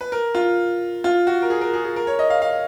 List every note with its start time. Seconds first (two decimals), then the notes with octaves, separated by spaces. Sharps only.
0.01 B4
0.12 A#4
0.35 F4
1.04 F4
1.27 F#4
1.42 A#4
1.50 G#4
1.61 A#4
1.73 G#4
1.84 G#4
1.96 A#4
2.07 C#5
2.19 D#5
2.30 F5
2.42 F5